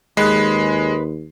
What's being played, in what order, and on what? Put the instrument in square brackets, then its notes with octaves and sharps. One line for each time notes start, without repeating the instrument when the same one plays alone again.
[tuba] D#2 [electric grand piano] G#3 [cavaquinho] B4 D#5